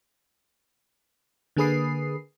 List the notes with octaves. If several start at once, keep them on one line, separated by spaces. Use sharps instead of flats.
D3 A#3 G#4 B4 D#6 C7